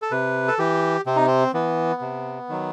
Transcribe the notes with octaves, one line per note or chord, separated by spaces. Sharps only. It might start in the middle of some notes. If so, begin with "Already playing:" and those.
A4
C3 B4
A4
E3 G4
C3 C4
D#4
C4
E3 B3
C3
D#3 F#3